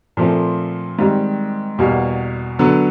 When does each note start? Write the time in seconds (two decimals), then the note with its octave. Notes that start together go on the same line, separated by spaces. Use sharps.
0.17 A#2 F3 A3 C4
0.99 G#2 D#3 G3 C4
1.78 E2 B2 G3 A#3
2.59 D3 F#3 B3